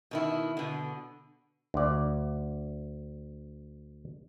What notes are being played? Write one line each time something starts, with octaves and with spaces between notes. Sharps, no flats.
B2 D#3 E4
B2 D3
D2 D5